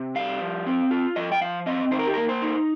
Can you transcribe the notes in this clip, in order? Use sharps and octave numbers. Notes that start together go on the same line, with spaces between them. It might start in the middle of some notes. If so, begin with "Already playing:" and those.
Already playing: C3
G3 F5
F3
C4
F4
F3 D#5
G5
F3 F5
C4 D#5
D#3 C5
A#4
G4
A#3 A#4
C5
D#4